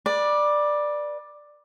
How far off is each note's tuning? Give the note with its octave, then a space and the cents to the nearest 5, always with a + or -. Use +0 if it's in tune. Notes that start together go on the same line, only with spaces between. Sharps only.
B4 -25 D5 +10